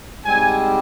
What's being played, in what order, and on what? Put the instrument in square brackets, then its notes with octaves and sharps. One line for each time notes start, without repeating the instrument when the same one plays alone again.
[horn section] G#2 G3 C4 G#5